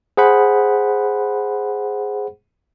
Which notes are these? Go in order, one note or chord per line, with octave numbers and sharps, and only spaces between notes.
G#4 C5 F#5 B5